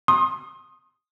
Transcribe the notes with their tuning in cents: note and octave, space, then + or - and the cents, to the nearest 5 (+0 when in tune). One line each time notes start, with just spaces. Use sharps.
C6 +35 D#6 +0